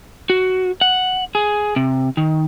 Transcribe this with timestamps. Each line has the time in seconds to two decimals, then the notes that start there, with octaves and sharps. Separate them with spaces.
0.30 F#4
0.81 F#5
1.35 G#4
1.76 C3
2.17 D#3